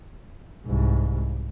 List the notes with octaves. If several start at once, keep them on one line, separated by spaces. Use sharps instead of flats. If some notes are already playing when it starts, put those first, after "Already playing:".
C2 G#2